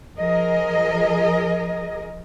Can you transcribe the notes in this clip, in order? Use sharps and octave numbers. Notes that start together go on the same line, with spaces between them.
F3 G#4 A#4 D#5